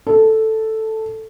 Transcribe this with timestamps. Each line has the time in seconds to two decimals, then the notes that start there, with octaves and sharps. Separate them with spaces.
0.07 A4